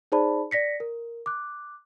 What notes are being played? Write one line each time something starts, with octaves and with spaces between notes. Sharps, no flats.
D#4 G#4 C5 D5 A5 B5
D5 A#6 B6 C#7
A#4
D6 F#6